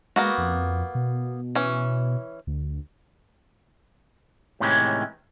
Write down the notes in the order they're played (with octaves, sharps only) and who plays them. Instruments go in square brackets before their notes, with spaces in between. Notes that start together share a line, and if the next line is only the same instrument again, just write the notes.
[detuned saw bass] G#3 [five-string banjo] A#3 B3 F#4
[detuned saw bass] F2
B2
[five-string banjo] E3 C#4
[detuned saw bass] D2
[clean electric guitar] A2 C3 D#3 E3 G#3 C#4